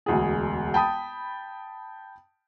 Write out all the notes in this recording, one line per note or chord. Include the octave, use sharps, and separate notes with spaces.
E1 D2 G#4
G5 A5 B5 D#6